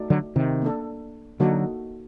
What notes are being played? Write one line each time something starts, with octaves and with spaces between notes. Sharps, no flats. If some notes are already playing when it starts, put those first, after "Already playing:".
Already playing: A3 D#4 F#4 A4 D5
D3 F#3
C3 D#3
A#3 D4 A4
D3 F#3 A#3 D#4 F#4 A4